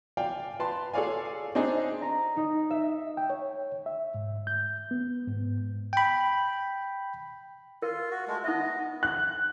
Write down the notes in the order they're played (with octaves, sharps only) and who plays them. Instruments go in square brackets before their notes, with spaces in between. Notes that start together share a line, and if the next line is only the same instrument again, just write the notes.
[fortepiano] D5 F5 G5 G#5
B4 A5 C6
G#4 A4 C#5 D5 F5 G#5
C4 D4 D#4 G#4
[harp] A#5
D#4
E5
[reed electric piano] G5
C#5
E5
G#2
G6
B3
G#2
[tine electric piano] G5 B5
[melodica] F4 [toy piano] A#4
[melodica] F#4
G#3 A3 F#4
[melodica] B3 D#5 [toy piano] D#4 E5
[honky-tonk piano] F#6